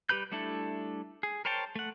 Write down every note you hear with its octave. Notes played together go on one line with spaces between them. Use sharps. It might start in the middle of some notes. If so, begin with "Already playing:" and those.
G3 G4 B4 B5 G6
G3 A3 D4 E4 A4
G#4
A#4 C5 C#5 G5 A5
A3 F#5